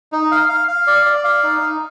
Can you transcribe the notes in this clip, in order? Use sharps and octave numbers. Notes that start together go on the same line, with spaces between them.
D#4
F5
F5
F5
D5
D5
F5
D#4
D#4